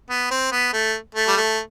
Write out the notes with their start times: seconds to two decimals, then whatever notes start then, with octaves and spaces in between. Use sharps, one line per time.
0.09 B3
0.31 C4
0.52 B3
0.73 A3
1.15 A3
1.27 G3
1.37 A3